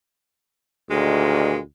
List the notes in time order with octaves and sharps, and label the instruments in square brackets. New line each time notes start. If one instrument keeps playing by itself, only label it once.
[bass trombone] D2 [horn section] A#2 D#3 G#3